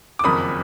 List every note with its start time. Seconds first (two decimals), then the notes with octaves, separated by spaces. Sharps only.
0.19 D6
0.24 F#1 F2 D#3 B5 D#6